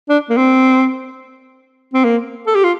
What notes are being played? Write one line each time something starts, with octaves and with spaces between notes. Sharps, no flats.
D4
A#3
C4
C4
A#3
A4
G4
F4